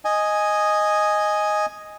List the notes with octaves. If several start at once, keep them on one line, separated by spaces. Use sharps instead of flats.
D#5 G#5